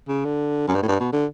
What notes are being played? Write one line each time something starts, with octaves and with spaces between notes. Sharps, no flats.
C#3
D3
F#2
G2
A2
G2
B2
D3